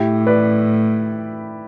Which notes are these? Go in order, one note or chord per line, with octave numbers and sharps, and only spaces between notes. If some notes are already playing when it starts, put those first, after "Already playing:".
Already playing: A2 E4 G4
B4 D5